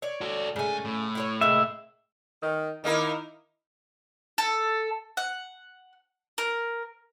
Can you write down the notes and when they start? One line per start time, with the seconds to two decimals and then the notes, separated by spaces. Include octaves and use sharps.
0.02 C#5 D5
0.21 F#4 A4
0.56 G#2 C#3 A3 G#5
0.85 A2
1.15 E4 F4 C#5
1.41 C3 G#3 A#3 E5
2.42 D#3
2.84 D#3 A#3 D#4 E4 A#4
4.38 A4
5.17 F#5
6.38 A#4